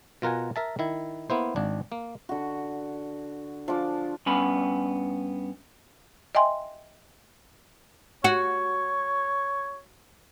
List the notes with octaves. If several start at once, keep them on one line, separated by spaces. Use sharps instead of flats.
B2 F4 A#4 F#5 G#5
A#4 E5 A5
D#3 E4
A#3 B3 E4 C5
G#1 D4
A#3
D3 F#4
F3 D4 D6
G2 B3 C#4 G#5 B5
D#5 E5 G5 G#5 C6
F#4 C#5